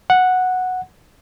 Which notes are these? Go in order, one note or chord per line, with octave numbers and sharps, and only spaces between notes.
F#5